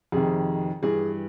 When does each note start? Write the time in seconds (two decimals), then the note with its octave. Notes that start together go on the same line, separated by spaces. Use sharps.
0.12 F2 C3 D#3 G#4
0.82 G2 E3 G#4